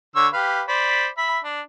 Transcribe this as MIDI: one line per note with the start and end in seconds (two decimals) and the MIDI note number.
0.16 0.28 50
0.16 0.28 73
0.16 0.28 88
0.33 0.62 67
0.33 0.62 71
0.33 0.62 77
0.68 1.08 72
0.68 1.08 74
0.68 1.08 83
1.18 1.39 76
1.18 1.39 83
1.44 1.61 62